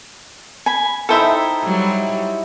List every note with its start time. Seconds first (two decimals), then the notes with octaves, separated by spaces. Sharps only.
0.66 G#5 B5
1.09 D#4 E4 A4 C5 E5 G5
1.64 F#3 G3